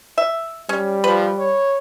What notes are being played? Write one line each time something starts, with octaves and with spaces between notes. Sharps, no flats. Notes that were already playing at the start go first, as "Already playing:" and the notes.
E5
G3 C#4
F3 B4
C#5